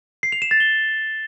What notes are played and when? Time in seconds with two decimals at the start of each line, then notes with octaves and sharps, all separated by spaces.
0.23 C7
0.32 F7
0.42 E7
0.51 A6
0.60 G7